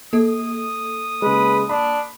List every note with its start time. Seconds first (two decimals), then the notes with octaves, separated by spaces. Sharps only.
0.13 A#3 A4 D#6
1.22 C#3 G#3 B4
1.69 D4 B5